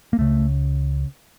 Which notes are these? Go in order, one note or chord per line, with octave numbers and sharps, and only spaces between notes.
A#3
C#2 C#3 A3